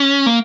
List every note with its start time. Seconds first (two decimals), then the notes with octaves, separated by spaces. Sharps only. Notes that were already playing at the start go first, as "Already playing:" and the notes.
Already playing: C#4
0.26 A#3